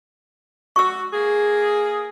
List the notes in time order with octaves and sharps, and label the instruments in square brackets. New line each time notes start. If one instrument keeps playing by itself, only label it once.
[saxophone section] F#4 [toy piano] C#6 E6
[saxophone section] A#3 G#4